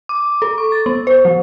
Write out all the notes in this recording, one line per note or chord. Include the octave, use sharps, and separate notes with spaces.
D6
A4
C#6
A6
B3
C5
F3